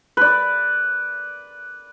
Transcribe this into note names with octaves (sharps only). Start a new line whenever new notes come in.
B4 D5